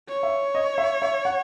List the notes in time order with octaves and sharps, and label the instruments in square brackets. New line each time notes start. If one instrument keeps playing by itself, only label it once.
[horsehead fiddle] C#5
[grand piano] E5
D#5
E5
E5
F#5